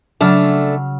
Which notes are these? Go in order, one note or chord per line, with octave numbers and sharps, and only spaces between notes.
C#3 F#3 A3 D4 F6